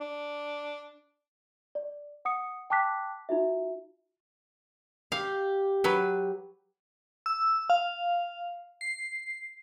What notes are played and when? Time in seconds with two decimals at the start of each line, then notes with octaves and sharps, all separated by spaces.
0.01 D4
1.75 D5
2.25 F#5 D#6 C#7
2.70 G5 A5 D6 F#6 B6
3.29 D#4 F4 F#4 E5
5.12 G4 F5
5.84 F#3 B4
7.26 E6
7.70 F5
8.81 C7